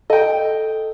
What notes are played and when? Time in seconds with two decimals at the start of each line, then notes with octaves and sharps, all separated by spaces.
0.10 A4 D#5 G5